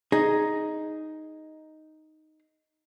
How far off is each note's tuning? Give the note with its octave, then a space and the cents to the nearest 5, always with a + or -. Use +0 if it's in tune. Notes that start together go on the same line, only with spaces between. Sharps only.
D#4 +0 G#4 +0